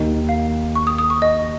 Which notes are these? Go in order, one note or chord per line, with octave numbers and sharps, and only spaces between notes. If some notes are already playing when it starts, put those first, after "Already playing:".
Already playing: D#2 D#3 A#3 D#4
F5
C#6
D#6
D#6
C#6
D#5